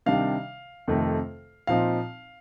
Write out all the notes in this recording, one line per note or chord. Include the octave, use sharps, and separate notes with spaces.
C3 D#3 G3 D4 F5
F2 C3 D#3 A3
A#2 F3 C4 D#4 F5